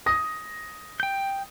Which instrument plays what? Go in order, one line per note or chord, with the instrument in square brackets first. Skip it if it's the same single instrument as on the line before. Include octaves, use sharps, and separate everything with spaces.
[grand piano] D#6 A#6
[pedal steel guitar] G5 G6